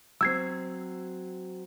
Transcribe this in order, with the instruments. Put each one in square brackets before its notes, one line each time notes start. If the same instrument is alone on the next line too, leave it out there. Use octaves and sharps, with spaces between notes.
[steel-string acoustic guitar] F#3 C4 [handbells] E6 G#6 C7